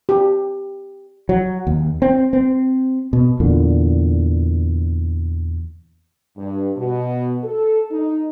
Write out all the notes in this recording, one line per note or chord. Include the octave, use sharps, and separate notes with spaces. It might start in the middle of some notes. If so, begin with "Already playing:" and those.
G4
F#3
D#2
C4
C4
B2
E2 A#2 D3
G2
B2
A4
D#4